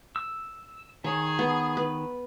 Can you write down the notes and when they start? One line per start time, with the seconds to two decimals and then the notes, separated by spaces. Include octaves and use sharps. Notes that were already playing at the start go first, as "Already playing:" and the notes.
0.16 E6
1.04 D#3 G#4 C#5
1.39 B3
1.77 B4